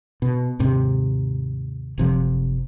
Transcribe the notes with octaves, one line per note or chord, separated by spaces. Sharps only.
B2
D#2 G#2 C3
F#1 C3 F3